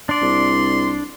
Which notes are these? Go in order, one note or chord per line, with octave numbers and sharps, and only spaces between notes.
D4 D5 C6
C2